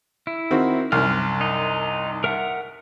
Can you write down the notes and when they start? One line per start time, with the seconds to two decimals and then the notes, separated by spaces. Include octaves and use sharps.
0.27 E4
0.51 D#3 C4 F#4
0.92 C2 F#2 F6
1.41 D#4
2.24 A#4 E5 F#5